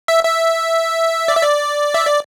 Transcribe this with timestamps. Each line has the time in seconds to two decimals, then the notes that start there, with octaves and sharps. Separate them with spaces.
0.08 E5
0.24 E5
1.28 D5
1.36 E5
1.43 D5
1.94 E5
2.07 D5